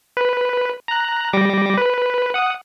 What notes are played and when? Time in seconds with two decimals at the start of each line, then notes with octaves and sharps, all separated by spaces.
0.17 B4
0.88 A#5 F#6
1.33 G3 D6 A#6
1.78 B4
2.34 F#5 D#6